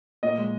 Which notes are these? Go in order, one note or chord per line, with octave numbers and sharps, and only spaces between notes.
A#2 D#5
G#3